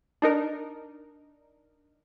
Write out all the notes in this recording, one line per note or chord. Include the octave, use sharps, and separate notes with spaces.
D4 D#4 A#4